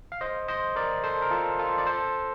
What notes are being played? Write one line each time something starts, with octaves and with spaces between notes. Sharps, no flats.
F5
C5 D#5
C5 D#5
A#4 D5
A4 C5
A#4
F4 A4
F4 A4
D5
A4 C5